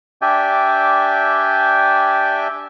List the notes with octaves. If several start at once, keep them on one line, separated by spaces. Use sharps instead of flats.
D4 G4 D5 E5 G5 G#5